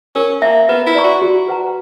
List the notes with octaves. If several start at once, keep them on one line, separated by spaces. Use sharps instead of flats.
C#4 A#4
A#3 E5 A#5
B3 B4
E4
D5 A#5 C#6
F#4
F#4
B4 F#5 A#5